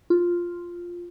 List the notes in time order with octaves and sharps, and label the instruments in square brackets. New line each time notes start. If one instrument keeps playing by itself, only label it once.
[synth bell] F4